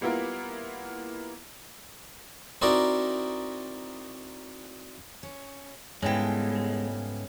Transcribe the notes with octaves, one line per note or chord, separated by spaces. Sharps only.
G3 A#3 B3 E4 F4 A#4
C4 D#4 E4 F#4 A#4 D5
C#4
G#2 C#3 E3 G3 G#3 B3 A4 G5